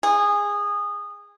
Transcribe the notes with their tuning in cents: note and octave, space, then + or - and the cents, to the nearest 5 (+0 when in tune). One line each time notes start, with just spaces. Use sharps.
G#4 -20